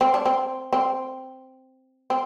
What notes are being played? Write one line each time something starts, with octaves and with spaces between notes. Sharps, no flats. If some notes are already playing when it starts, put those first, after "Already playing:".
C4
D4
C4
C4
C4